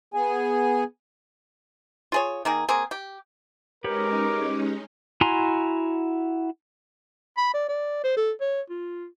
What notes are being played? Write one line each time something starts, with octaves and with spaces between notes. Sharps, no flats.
B3 G#4 G#5
F4 G#4 C#5
D#3 A#3 G#4
A#3 C4 G#4
G4
G#3 C#4 D#4 G4 A#4 B4 C#5 D6
E4 F#4 G#5 A#5 C6
B5
D5
D5
C5
A4
C#5
F4